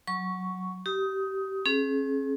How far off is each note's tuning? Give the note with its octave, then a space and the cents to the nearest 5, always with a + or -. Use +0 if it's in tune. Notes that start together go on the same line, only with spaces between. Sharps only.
F#3 +0 C#6 +0
G4 -25 D#6 +20
C#4 -40 G#4 +35